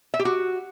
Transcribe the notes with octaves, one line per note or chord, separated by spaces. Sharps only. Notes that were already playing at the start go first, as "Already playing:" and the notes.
E5
G4
F#4